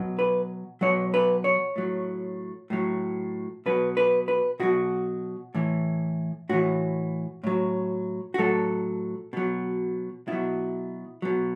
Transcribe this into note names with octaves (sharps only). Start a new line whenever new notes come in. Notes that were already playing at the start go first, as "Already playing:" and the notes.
Already playing: B2 F#3
B4
B2 F#3 C#5
B4
C#5
A2 F#3
A2 F#3
B2 F#3 B4
B4
B4
B2 F#3 F#4
A2 E3
A2 E3 F#4
A2 F#3
F#4
A2 F#3 A4
B2 F#3
B2 F#3 E4
B2 F#3